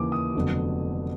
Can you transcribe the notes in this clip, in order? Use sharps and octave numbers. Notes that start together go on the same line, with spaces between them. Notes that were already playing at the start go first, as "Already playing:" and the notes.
Already playing: D#2 C#3 E3 D6
D#6
F1 F2 D3 F#3 B3